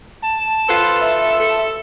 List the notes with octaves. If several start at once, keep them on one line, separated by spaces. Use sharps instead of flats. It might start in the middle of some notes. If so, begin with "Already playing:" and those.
A5
F4 A4 B4 C5
E5
A4